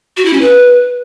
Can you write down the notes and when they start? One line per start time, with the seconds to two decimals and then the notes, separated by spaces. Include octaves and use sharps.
0.17 F#4
0.25 E4
0.33 C#4
0.41 B4